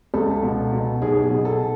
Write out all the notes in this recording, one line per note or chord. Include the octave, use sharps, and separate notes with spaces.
C#2 A4
B2
B2
B1 G#4
G#4
B2
A4